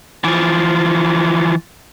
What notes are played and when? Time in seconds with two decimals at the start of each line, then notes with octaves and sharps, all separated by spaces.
0.24 E3 F3